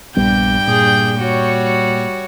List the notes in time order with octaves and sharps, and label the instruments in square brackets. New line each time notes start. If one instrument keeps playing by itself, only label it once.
[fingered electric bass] A#1 G3 B3 [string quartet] G2 G5 G6
[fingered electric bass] A#2 [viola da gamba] G#4
[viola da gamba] G3 F#4 C#5